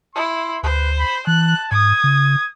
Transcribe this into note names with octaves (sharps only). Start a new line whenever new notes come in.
E4 C6
D2 B4 C5
B5
E3 A5 F#6
G#2 D#6 G#6
C#3